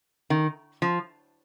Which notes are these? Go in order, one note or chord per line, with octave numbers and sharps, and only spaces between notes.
D#3
F3